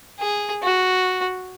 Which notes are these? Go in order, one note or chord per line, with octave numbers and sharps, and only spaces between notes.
G#4
F#4